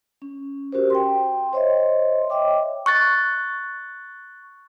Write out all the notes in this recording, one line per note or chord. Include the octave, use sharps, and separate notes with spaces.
C#4
C#4 F#4 G4 A#4 C5
G5 C6
C5 C#5 D#5 E5 C6
C#5 D#5 E5 G5 D6
C#6 F#6 A6